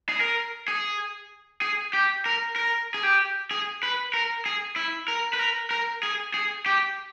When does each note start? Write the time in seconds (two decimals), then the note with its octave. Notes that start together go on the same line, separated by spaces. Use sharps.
0.09 G#4
0.21 A#4
0.68 G#4
1.62 G#4
1.93 G4
2.26 A#4
2.56 A#4
2.94 G#4
3.03 G4
3.51 G#4
3.83 B4
4.14 A#4
4.46 G#4
4.76 E4
5.08 A#4
5.33 B4
5.39 A#4
5.71 A#4
6.03 G#4
6.34 G#4
6.66 G4